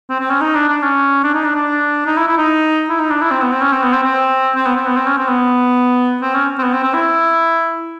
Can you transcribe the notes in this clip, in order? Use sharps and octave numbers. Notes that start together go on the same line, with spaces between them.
C4
C4
C#4
D#4
D4
D4
C#4
D4
D#4
D4
D4
D#4
E4
E4
D#4
E4
D#4
D4
E4
C4
B3
C4
C#4
C4
B3
C4
C4
C4
B3
C4
B3
C4
C#4
C4
B3
C4
C#4
C4
B3
C4
C4
E4